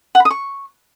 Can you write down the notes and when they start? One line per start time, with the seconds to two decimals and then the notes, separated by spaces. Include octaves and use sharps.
0.15 F#5
0.20 B5
0.25 D#6
0.30 C#6